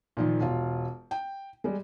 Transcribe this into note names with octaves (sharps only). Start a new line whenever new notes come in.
A#2 D#3 F3
E1 F4
G5
G3 G#3